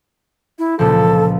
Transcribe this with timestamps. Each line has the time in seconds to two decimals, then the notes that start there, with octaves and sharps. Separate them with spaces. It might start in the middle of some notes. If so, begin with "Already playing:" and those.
0.59 E4
0.79 C#2 A#2 F3 A4